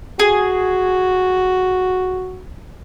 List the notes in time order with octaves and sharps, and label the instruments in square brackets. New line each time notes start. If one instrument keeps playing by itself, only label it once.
[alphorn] F#4 [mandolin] G#4